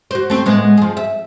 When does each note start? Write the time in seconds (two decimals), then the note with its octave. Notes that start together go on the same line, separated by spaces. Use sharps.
0.11 F#4 C5
0.30 A3 C4
0.46 A2 G#3 B3
0.77 F3 G#4
0.97 E5